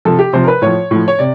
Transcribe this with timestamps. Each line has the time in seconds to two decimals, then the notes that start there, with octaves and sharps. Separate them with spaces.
0.05 C3 F3 A4
0.19 G4
0.33 C3 F3 C5
0.44 A#4
0.48 B4
0.62 A2 F3 C#5
0.91 A2 F3
1.08 C#5
1.19 C3 D5